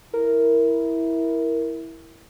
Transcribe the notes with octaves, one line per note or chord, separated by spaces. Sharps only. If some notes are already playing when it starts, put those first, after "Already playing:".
E4 A#4